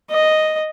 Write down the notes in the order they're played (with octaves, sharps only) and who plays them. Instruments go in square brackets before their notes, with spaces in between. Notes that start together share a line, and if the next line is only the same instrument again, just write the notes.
[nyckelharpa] D#5